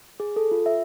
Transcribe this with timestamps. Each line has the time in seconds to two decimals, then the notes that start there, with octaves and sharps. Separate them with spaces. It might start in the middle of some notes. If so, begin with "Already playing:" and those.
0.20 G#4
0.36 A4
0.51 F4
0.66 E5